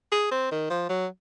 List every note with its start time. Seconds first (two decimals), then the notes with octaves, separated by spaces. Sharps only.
0.12 G#4
0.31 C4
0.52 D#3
0.70 F3
0.89 F#3